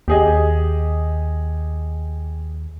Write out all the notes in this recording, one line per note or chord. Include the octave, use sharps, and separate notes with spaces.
D#2 G4 G#4 D#5